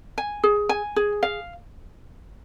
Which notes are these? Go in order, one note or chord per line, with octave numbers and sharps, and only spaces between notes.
G#5
G#4
G#5
G#4
F5